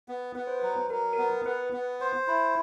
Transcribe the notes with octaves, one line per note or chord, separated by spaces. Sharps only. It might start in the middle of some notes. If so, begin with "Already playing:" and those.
B3
B3 B4
C5
F#3 B4
F#3 A#4
A#4
B3
B3 B4
B3
C5
E4